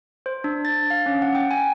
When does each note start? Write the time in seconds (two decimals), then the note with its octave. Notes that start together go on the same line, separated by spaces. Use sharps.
0.26 C5
0.44 D4
0.65 A6
0.90 F5
1.06 C#4
1.22 F#5
1.35 G5
1.51 G#5